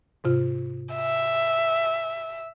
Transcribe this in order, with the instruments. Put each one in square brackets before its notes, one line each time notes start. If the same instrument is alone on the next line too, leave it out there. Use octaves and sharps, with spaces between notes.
[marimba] G#2 C3 F4
[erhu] E5